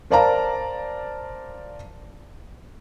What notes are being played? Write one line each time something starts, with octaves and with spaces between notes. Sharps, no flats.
A#4 C5 D5 F5 A5 A#5